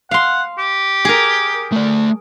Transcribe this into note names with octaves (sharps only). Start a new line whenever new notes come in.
F5 F#5 C6
G4
G#4 A#4
A3 D5